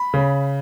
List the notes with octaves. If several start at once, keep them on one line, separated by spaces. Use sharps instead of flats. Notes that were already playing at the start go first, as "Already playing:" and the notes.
Already playing: B5
C#3